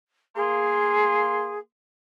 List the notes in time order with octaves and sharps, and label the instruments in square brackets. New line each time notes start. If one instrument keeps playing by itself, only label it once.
[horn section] A#3 C6 [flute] G#4